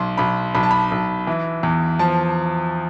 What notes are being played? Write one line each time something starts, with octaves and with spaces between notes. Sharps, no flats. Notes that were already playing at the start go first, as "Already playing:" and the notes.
Already playing: B1 C6
B1 B5
B1 B5
A5
B5
B1
E3
E2
F3 A5